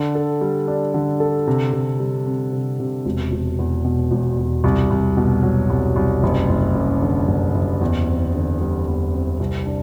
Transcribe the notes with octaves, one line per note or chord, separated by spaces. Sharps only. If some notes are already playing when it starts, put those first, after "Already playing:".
Already playing: D3
A4
G3
D4
D3
A4
C3
C3
G3
C4
C3
C3
E1
E1
E2
B2
E1
E1
C2
C2
B2
F#3
C2
C2
F#1
F#1
F#2
D3
F#1
F#1
E2
C4
D3
G3
E2
C4
C2
D4